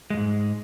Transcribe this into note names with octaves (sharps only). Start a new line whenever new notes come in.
F2 G#2 G#3